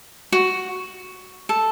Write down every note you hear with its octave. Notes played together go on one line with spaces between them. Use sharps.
F#4
A4